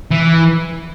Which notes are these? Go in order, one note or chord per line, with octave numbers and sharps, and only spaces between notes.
E3